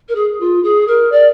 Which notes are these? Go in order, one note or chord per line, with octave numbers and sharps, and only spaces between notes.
A#4
G#4
F4
G#4
A#4
D5